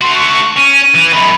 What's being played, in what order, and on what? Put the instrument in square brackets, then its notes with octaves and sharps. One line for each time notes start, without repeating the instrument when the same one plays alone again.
[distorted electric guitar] A3 F#4 [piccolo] C6
[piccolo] C#6
[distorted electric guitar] C#4 [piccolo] D#7
[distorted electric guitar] E3
[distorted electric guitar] F#2 D#3 [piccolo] B5